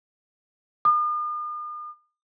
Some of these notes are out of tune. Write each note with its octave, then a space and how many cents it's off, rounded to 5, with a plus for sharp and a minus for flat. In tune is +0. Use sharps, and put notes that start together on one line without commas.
D#6 -45